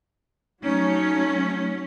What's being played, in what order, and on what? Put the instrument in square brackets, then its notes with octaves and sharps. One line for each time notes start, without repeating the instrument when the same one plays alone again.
[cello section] F#3 A3 C#4 [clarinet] D#4